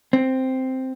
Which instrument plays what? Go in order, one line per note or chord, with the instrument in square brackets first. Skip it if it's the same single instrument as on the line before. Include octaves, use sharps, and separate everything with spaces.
[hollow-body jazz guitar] C4